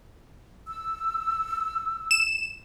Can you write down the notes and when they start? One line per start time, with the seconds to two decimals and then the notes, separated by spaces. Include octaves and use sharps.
0.67 E6
2.11 E7